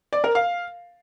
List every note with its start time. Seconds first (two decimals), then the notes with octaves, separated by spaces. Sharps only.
0.13 D5
0.24 A#4
0.35 F5